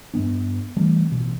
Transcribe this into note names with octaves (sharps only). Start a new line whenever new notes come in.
G2 B3 D4
E3 G3 A3 C4
A1 B2